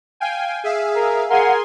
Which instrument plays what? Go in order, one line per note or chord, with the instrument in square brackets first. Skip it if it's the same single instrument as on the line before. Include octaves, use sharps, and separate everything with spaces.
[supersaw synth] F5 G5 G#5
G#4 E5 F5
[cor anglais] A#4
[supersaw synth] G#4 G#5 C6 [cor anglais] A#4 [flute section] F5 F#5